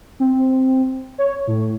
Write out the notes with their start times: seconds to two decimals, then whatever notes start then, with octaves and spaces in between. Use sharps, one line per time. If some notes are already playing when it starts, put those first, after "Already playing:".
0.20 C4
1.18 C#5
1.47 A2